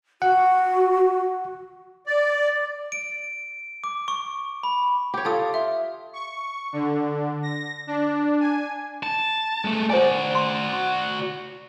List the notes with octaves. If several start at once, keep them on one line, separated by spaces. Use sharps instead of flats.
F#4 F#5
D5
D7
D6
C#6
B5
G4 C#5
F4 A4 G5 D#6
E5 C6
C#6
D3
A#6
D4
G#5
A5
G#3 A3
F#4 C5 D5 G#5
C6